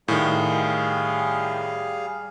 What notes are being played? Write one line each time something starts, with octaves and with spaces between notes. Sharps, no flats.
A2 D#3 G3 G#4 F5